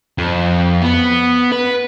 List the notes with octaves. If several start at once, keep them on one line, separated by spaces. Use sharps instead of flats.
F2
B3
B4